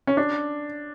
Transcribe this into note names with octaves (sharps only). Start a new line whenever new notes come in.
C#4
D4